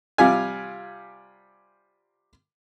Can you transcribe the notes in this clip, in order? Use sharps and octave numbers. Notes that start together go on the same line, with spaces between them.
C3 G3 F4 G#5